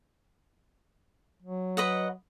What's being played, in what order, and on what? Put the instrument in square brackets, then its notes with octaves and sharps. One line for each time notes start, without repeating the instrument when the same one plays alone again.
[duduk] F#3
[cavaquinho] B4 D#5 F#5